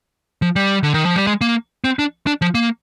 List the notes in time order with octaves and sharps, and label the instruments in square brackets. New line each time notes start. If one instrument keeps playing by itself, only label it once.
[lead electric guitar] F3
G3
D3
D#3
F3
G3
G#3
A#3
C4
D4
D4
F3
A#3